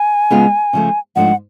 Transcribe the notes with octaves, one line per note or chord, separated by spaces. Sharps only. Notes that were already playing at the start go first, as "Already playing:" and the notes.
Already playing: G#5
C#3 G#3 B3 F4
C#3 F3 A3
G#2 F3 A3 D4 F4 F#5